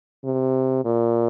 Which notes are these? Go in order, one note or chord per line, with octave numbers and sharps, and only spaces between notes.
C3
A#2